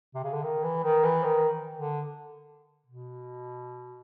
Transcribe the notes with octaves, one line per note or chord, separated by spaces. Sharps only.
C3
C#3
D3
D#3
E3
D#3
E3
D#3
D3
B2